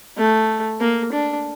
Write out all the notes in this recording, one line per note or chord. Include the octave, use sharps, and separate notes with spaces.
A3
A#3
D4